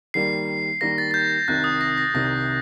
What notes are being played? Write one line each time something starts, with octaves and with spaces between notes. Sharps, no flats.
D#3 G3 A#3 C7
D#3 G3 A#3 A#6
A6
A6
G6
C2 C3 D#3 F#6
D#6
A#6
A#6
C2 C3 D#3 A#6